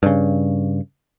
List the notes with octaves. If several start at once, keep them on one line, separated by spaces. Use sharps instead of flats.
G2 C#3